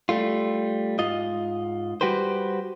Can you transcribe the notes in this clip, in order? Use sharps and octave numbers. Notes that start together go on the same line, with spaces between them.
G3 A3 F4
G#2 F4 D#5
G3 F#4 G4 B4 C5